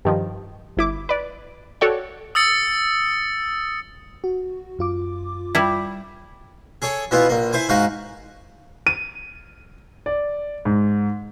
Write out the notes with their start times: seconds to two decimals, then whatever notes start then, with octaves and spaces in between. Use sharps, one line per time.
0.05 G2 D#3 F3
0.77 G1 E4 D6
1.09 B4 D5
1.81 F#4 A4 C#5 D5 F#5 G5
2.35 D#6 E6 A6 C#7
4.24 F#4
4.79 F#2 F4 D6
5.55 G3 E4
6.82 G#4 A4 C#5
7.11 B2 E3 B3 E4 F4
7.29 A#1 A#3
7.53 E4 C5 G#5
7.69 G#2 D#4 F#4 F5 F#5
8.87 D#7
10.06 D5
10.65 G#2